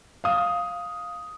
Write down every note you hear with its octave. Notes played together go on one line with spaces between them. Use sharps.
F5 D#6